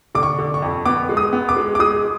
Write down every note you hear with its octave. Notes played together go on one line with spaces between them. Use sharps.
D3 D6
C#6
D3
C#6
F2
B3 D6
G#3
D#6
B3
D6
G#3
D6
G#3 D#6